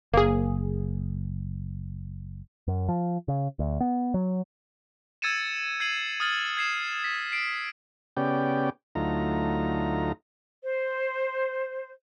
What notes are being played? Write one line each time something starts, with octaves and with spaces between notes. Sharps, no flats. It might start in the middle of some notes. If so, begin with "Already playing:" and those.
F#1 A#3 G#4
F#2
F3
C#3
D2
B3
F#3
E6 G#6 A6 C#7 D#7 E7
G#6 C7 D#7 F#7
D#6 F6 A6 F#7
G#6 C7 E7
B6
C7 D7
C#3 B3 C#4 G4 D5 G5
D2 F#3 A3 D#4 F4 A#5
C5